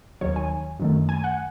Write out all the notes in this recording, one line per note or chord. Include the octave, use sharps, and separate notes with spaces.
D#2 D#3 F#3 C#5
G#5
F#2 D#3 A3
G#5
F#5